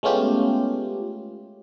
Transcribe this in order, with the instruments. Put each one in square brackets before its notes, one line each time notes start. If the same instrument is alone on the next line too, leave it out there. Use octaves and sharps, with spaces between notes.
[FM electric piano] G#3 A3 B3 C#4 F4 G4